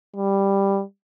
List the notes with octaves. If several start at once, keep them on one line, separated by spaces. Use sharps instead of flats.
G3